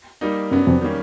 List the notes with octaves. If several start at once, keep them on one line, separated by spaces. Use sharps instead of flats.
G3 A#3 D#4
F#2 F#3 B3 D4
F2
D#3 G3 A#3 C#4